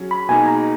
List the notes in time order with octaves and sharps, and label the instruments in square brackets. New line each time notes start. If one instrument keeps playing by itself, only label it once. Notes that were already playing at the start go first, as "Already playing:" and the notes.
Already playing: [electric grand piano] F#3 C#4 G#4
[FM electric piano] B5
[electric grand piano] B2 A#3 D#4 G#4 [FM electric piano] G#5
[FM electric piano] A#5